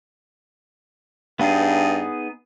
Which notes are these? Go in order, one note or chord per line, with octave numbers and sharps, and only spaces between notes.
G2 B3 D#4 G#4